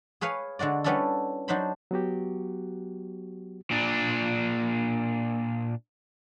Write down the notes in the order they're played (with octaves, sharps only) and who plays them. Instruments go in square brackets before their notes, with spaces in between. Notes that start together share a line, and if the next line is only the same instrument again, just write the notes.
[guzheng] G#4 B4 C#5 F5
D3 G#3 F#4 D5
G3 B3 C#4 D4 E4 A4
F#3 D4 D#4 C5 B5
[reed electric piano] F#3 B3 F#4 G4
[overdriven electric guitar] A#2 D4